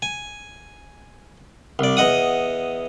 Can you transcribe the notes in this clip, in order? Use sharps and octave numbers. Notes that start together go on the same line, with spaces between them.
G#5
C2 D5
E2 D#5 F#5 D#6